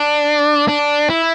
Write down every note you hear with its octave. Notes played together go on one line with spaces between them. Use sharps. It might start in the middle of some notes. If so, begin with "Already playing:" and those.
Already playing: D4
D4
E4